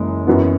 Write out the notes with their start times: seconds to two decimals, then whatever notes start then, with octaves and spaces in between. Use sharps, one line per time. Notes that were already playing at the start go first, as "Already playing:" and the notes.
Already playing: F#1 F#2 E3 G#3
0.27 F#2 E3 B3 F#4